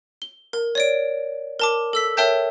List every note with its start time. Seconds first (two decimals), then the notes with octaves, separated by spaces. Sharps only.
0.22 G7
0.53 A#4
0.75 C#5 D5 D7
1.60 A#4 A5 D6
1.93 A4 E6 B6
2.17 A#4 C#5 E5 G5 A5 G6